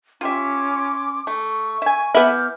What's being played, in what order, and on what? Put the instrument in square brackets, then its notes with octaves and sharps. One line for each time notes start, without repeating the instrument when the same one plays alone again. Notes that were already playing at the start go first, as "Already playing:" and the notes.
[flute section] C#4 C6 D6 [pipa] F4 G4 E5
[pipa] A3 [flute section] C#6
[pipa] E5 G#5
[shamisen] B3 E4 [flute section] D6 F6 G6